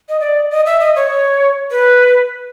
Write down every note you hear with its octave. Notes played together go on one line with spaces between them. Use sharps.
D#5
D5
D#5
E5
D#5
C#5
B4